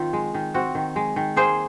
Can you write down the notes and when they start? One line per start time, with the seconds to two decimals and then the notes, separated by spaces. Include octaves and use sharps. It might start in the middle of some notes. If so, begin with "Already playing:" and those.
Already playing: D#3 C4 F4
0.13 G#3
0.34 D#3
0.54 C4 F#4
0.75 D#3
0.96 G#3
1.16 D#3
1.36 A#3 G#4 C5